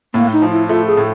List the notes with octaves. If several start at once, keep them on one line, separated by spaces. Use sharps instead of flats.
A2 A#3
D#4
F3
E4
A3 F4
G#4
A2